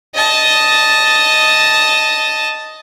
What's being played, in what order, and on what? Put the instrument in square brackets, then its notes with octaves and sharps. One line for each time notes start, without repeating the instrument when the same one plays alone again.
[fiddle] D#5 A5